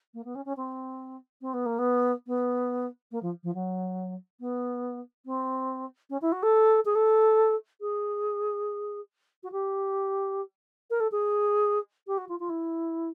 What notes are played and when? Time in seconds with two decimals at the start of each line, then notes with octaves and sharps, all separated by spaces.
0.14 A#3
0.25 B3
0.35 C#4
0.45 C#4
0.57 C4
1.41 C4
1.53 B3
1.66 A#3
1.78 B3
2.27 B3
3.11 A#3
3.22 F3
3.43 F3
3.54 F#3
4.40 B3
5.26 C4
6.10 C#4
6.21 E4
6.32 F#4
6.43 A4
6.85 G#4
6.95 A4
7.81 G#4
9.43 F#4
9.52 G4
10.90 A#4
11.00 A4
11.11 G#4
12.07 G4
12.17 F#4
12.28 F4
12.39 F4
12.49 E4